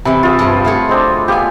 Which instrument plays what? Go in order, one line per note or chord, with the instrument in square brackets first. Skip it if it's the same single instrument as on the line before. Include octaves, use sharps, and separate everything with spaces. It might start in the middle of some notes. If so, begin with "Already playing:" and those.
[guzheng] C3 E3 [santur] B5
[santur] F4 G#4 E5
[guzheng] G2 F3
A3 F#4 C#5
[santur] G#3 C4 D4
[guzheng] B3 G#5 [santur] G4 F5